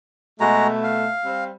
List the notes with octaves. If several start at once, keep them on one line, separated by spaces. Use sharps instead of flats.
B2 G#3 A3 F#4 A#5
F5
G3 C4